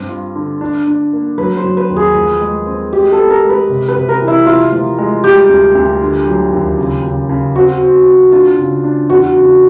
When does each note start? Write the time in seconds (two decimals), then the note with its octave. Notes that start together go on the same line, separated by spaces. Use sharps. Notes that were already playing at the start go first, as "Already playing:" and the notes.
Already playing: G2 C4
0.09 F4
0.35 D3
0.61 D4
0.87 D4
1.13 A#3
1.38 F#3 B4
1.57 C5
1.64 F#3
1.77 B4
1.90 D#2
1.96 G#4
2.15 F3
2.41 G#3
2.66 C4
2.92 G#3 G4
3.12 A4
3.18 B3
3.30 A#4
3.44 G#3
3.50 B4
3.69 C3
3.88 B4
3.96 C3
4.09 A#4
4.21 E3
4.28 E4
4.46 F3 F4
4.72 F3
4.98 G#3
5.24 G3 G4
5.49 D2
5.75 D2
6.01 D3
6.26 F#3
6.52 D#2
6.78 C#3
7.04 C#3
7.29 C#3
7.56 C4 F#4
7.82 C4
8.06 C4
8.32 D4 F4
8.59 C#3
8.84 D4
9.10 E2 F#4
9.36 C#3